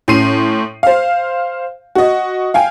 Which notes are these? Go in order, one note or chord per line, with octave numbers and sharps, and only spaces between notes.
A2 C#4 C6 C7 D#7
C5 F5
F#4 D#5
F5 G5 G#5